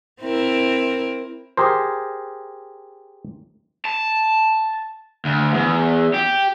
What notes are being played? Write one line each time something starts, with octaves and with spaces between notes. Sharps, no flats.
C4 E4 A#4
G4 G#4 A#4 C5
A5
D2
E2
G4